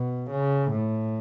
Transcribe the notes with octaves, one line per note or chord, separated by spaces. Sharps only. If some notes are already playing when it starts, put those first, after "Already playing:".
Already playing: B2
C#3
A2